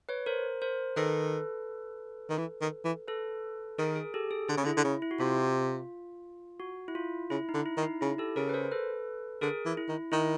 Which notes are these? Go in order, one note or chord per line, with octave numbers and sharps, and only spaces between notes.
B4 C#5
A#4 C5
A#4 C5
D#3 A4 B4
D#3
E3
D#3
E3
A4 B4
D#3 G#4 A#4
G#4
G4 A4
G#4
D3 G#4
C#3
D3 E4
D3
C#3
E4
F#4
C3 F4
F#4
E4
F4
C#3 E4
D#4
D3
E4
D#3
D#4
C#3 E4
G4 A4
C#3 G#4 A#4
B4
A#4 C5
A4 B4
D3 G#4 A#4
E3
E4
D#3
D#3 E4